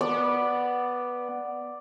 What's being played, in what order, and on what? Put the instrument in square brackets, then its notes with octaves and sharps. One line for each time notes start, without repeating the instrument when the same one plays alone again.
[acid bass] B3 [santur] D5